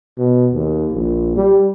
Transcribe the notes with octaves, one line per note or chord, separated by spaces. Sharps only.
B2
D#2
A#1
G3